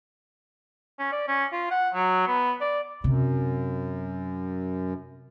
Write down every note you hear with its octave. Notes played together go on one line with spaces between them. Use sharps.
C#4
D5
C#4
F4
F#5
F#3
B3
D5
F#2 C3